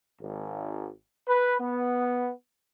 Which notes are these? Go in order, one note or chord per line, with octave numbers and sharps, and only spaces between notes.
G#1
B4
B3